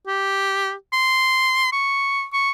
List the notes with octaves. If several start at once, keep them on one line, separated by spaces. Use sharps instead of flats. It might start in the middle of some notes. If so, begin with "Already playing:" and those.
G4
C6
C#6
C#6